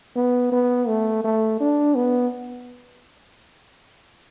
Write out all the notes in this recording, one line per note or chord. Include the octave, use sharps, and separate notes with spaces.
B3
B3
A3
A3
D4
B3